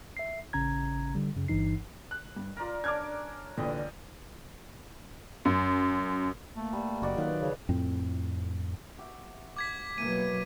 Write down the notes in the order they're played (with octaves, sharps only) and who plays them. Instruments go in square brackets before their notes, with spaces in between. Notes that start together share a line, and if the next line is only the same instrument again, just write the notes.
[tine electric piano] E5 C7
A1 C#3 C#4 A#5 G#6
D3 G3
F#2 C#3
G1 G2 E3 D#4 C7
[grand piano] F#6
G2
[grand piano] F4 A#5 [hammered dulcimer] A#4 D5
[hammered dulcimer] C#4 D4 [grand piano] D6 F6 G#6
[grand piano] A#1 D3 E3 [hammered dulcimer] G3 D#5
[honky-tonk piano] F#2
[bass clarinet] A3 [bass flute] A#3
[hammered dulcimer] G3
[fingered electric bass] F#1 [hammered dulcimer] F#4 D5 D#5
[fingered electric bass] D#3 F#3 [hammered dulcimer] F4 B4
[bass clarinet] C#3 [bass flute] C#5
[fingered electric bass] F2 A2 C4
[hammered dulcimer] F#4 G4 E5
[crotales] D6 G#6 B6
[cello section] B2 F#3 A#3 [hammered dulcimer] E3 E5 [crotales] D#7